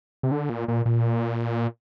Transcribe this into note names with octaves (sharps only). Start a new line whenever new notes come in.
C3
D3
A#2
A#2
A#2